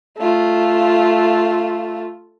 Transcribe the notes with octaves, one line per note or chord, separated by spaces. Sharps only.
A3 F4